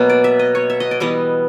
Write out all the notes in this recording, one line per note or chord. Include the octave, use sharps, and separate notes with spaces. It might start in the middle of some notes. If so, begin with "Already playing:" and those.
Already playing: B2 F#3 A#3
D5
E5
D#5
C#5
E5
D#5
D5
E3 G3 B3 D#5